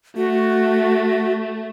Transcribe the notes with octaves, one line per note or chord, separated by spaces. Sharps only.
A3 F#4